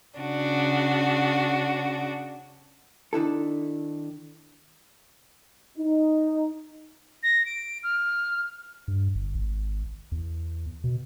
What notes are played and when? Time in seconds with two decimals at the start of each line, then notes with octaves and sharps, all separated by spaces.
0.20 C#3 D4 F#4
3.13 D#3 D4 E4 A4
5.78 D#4
7.23 A#6
7.46 D7
7.83 F6
8.88 G2
9.15 G1
9.35 G#1
10.12 E2
10.84 B2